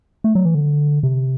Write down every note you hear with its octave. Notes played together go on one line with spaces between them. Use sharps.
A3
F#3
E3
D3
C3